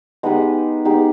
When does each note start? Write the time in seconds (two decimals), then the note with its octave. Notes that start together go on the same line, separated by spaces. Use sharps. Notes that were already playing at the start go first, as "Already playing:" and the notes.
0.23 G#3 B3 D#4 G4
0.85 G#3 B3 D#4 G4